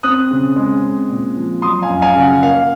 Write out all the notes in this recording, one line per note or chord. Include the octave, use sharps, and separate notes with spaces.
C4 D#6 F#6
C#3
G#3
C4
A#2
F3
F#3 C6 D#6
F5 G#5
F#2
F5 G#5
C#3
F#5
A#3 F5